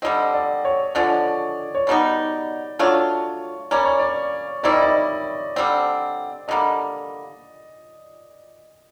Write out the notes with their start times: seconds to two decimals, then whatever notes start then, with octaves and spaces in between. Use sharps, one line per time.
0.02 D3 G3 C4 D#5
0.34 D5
0.65 C#5
0.95 D3 F3 G#3 D5
1.75 C#5
1.87 B2 G3 B3 D#4 D5
2.79 F#3 A3 D4 F4 C#5
3.71 G3 A#3 C#4 D5
3.85 C#5
3.99 D5
4.63 D#3 G3 C4 E4 D5
4.72 D#5
4.82 D5
5.56 D3 G3 C4 D5
6.48 D3 G3 A#3 D#5